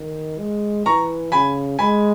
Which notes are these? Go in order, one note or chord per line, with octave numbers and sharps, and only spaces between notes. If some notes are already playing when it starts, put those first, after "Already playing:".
Already playing: D#3
G#3
E3 A#5 C#6
C#3 G#5 B5
G#3 G#5 B5